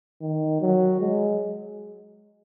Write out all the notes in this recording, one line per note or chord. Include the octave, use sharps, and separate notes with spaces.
D#3
F#3
G#3